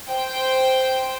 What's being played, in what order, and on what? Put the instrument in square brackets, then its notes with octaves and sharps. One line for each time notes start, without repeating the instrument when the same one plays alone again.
[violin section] C5 G5